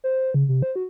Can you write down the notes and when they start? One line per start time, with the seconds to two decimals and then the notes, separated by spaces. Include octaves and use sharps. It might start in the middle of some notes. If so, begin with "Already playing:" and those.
0.04 C5
0.34 C#3
0.49 C3
0.62 C5
0.76 F#4